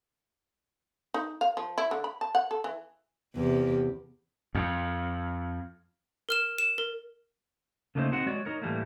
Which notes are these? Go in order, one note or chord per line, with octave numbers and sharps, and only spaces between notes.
D#4
F5
F3
E4
D3
B5
A5
F#5
A4
E3
E2 C3 G4
F2
A#4 F6 E7
E7
A#4
C#3 A3 A#3 D#4 E4 C5
C4 D#4 F#4 F#5
G#3 F#4 C#5 D5
D#4 A#4 C#5
A2 E3 G3 A3 A#3